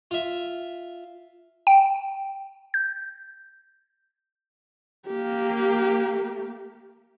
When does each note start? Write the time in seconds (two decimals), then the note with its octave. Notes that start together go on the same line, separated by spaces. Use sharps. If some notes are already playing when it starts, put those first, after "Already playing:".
0.11 F4 E5
1.67 G5
2.74 G6
5.06 A#3 G4